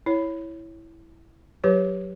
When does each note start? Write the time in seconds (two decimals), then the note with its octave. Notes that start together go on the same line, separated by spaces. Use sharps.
0.06 E4 C#5
1.64 F#3 G4 B4 C#5